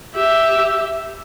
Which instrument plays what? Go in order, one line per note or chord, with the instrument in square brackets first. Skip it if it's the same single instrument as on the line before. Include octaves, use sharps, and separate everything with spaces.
[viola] G4 E5